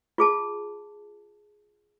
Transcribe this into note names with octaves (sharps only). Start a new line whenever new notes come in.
F4 G#4 A5